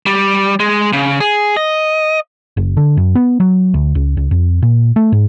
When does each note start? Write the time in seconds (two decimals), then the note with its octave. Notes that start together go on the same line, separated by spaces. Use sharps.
0.06 G3
0.60 G#3
0.93 C#3
1.20 G#4
1.57 D#5
2.57 F#1
2.77 D3
2.97 F#2
3.15 B3
3.40 F#3
3.74 D2
3.95 C#2
4.17 C#2
4.31 F2
4.63 A#2
4.96 A3
5.12 G#2